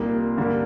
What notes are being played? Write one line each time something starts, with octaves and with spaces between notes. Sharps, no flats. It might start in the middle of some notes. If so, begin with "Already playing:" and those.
Already playing: C2 A#2 G3 A#3 D#4
G2 D3 G3 A#3